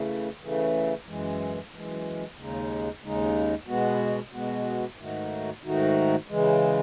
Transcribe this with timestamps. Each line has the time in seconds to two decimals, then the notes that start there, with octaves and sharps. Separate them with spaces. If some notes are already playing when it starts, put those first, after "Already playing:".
Already playing: C#3 E3 A3
0.42 C#3 E3 A3
1.07 F#2 E3 G#3
1.72 F#2 E3 G#3
2.37 D#2 C#3 G#3 D#4
3.02 D#2 C#3 G#3 D#4
3.68 B2 G#3 B3 F#4
4.33 B2 G#3 B3 F#4
4.98 G#2 D#3 A3 D#4 F#4
5.63 G#2 D#3 A3 D#4 F#4
6.28 C#3 E3 G#3